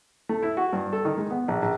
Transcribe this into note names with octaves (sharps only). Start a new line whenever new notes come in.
A3
E4
F#4
G2
A4
D#3
G#3
B3
A#1
A#1